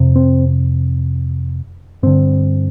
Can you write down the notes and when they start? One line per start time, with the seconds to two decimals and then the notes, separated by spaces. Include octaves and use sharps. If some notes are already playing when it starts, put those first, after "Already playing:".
Already playing: F2 C3
0.16 C4
2.03 G2 D3 C4